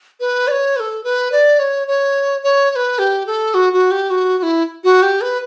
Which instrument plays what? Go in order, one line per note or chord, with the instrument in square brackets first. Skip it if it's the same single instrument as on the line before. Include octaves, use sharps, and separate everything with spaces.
[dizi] B4
D5
C#5
B4
A4
B4
D5
C#5
C#5
C#5
C#5
B4
G4
A4
F#4
F#4
G4
F#4
F#4
E4
F#4
G4
B4